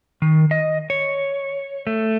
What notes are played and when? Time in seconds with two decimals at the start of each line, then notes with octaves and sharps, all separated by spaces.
0.22 D#3
0.51 D#5
0.90 C#5
1.87 A3